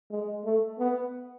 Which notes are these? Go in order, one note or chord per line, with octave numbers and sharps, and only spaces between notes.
G#3
A3
B3